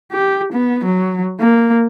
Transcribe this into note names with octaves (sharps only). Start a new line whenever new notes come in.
G4
B3
F#3
A#3